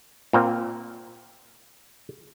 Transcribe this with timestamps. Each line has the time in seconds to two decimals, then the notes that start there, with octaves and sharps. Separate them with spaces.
0.33 A#2 A#3 C4